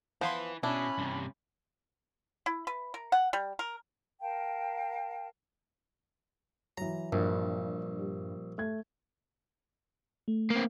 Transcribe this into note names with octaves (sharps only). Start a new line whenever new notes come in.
F3 B3 E4 B4 C5 F5 C6
B2 C#4 D4 E4 B5
G2 C3
E4
B4
A#4
F#5
G3
A#4
A#4 F5 G5 A5
E3 F#3 A#5
A#1 G2
G3
A3 G#6
A3
A#3 C4